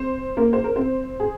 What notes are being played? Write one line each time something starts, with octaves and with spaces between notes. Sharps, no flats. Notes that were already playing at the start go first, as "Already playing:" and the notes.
Already playing: C4 C5
A#3 A#4
C5
A#4
C4 C5
G#4